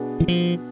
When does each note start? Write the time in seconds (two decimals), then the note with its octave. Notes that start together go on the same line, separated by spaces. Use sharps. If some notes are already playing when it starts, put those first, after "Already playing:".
Already playing: B2 B3 D4 G#4
0.20 E3
0.28 F3